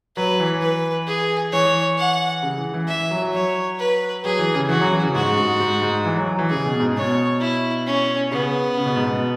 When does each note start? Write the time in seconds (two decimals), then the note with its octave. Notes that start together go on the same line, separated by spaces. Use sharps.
0.16 F#3 B4
0.40 E3
0.61 B4
1.07 G#4
1.52 E3 C#5
1.98 F#5
2.43 C#3
2.58 E3
2.74 E3
2.88 E5
2.99 E3
3.11 F#3
3.22 F#3
3.34 C#5
3.79 B4
4.24 F#3 G#4
4.39 E3
4.55 C#3
4.69 E3 F#4
4.81 F#3
4.93 E3
5.03 C#3
5.15 G#2 F#4
5.38 G#2
5.60 G#2
5.82 G#2
6.05 E3
6.16 F#3
6.27 F#3
6.39 E3
6.50 C#3 G#4
6.66 B2
6.80 G#2
6.96 B2 C#5
7.40 E4
7.86 C#4
8.31 C#3 B3
8.77 C#3
8.86 B2
8.96 G#2
9.06 B2